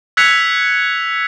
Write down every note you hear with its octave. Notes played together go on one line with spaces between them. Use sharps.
E6 F#6 G#6 B6 C#7 F7